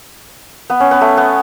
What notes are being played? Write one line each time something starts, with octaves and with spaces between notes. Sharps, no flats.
B3
C#4
B3
A3
B3